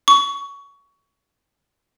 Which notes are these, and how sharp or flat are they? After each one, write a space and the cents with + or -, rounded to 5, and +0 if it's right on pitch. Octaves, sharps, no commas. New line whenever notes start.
C#6 +20